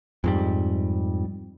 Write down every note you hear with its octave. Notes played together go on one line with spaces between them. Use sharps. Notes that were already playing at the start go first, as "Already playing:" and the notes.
F2 G#2 G3